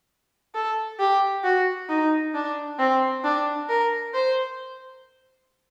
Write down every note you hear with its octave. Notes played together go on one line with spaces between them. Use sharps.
A4
G4
F#4
D#4
D4
C4
D4
A#4
C5